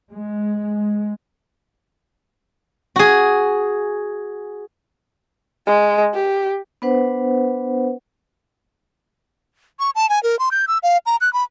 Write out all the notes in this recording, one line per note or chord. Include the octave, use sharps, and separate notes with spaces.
G#3
F#4 G#4
G#3
G4
B3 D4 B4 C5 F#5
C#6
A5
G#5
A#4
C6
G6
E6
F5
A#5
F#6
B5